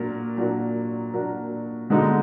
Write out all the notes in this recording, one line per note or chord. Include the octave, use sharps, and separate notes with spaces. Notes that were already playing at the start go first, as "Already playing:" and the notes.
Already playing: A#2 F#3 D4 F#4 A#4
A#2 F#3 D4 F#4 A#4
A#2 F#3 D4 F#4 A#4
D3 G#3 B3 D#4 F#4